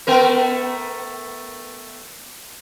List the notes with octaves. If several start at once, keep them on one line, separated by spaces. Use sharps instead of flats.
A3 B3 A#4